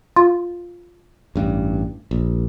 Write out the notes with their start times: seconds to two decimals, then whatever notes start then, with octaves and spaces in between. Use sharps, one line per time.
0.16 F4
1.36 A1 G2
2.11 A#1